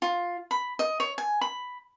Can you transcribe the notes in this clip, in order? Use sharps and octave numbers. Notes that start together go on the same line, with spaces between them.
F4
B5
D#5
C#5
G#5
B5